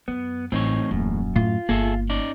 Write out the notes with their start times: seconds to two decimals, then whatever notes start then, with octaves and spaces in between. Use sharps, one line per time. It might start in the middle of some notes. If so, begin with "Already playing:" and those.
0.08 F#2 B3
0.52 A1 E2 A2 C4 D#4 C#5
0.91 D#1 F#2
1.36 A2 F4
1.69 G1 A#3 G#4 A4 E5
2.09 C#4 D#4 D5